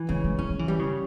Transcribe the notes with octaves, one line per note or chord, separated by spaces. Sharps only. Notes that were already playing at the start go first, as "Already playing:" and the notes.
Already playing: E3
C#3 G#3
G#3
G#3 C#4
F3
E3
G3
C#3